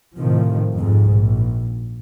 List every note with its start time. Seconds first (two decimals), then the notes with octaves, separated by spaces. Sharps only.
0.17 A2 C3 D#3 F3
0.74 F2 G#2
1.13 A#1